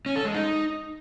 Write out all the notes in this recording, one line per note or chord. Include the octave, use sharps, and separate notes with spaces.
C#4
A4
G#3
D#4